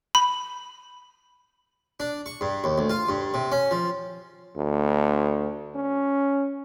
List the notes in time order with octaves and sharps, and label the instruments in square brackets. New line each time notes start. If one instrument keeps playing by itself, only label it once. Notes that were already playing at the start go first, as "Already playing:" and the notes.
[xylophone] B5
[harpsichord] D4
C#6
G2
D#2
D2
F4
G2
C3
C#4
F3
[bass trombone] D2
C#4